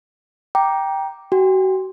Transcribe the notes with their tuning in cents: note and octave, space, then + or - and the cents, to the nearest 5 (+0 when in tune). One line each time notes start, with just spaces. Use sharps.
G5 +0 A#5 +10 D6 +0
F#4 +35 G5 +40